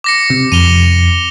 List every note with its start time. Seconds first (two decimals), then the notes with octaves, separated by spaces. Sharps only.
0.04 D6 A#6 C#7
0.30 C3
0.52 F2 D#7 F7 G7